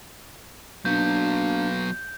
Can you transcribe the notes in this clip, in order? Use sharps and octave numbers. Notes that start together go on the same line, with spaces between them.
F#3 A#3 B3 D4 G6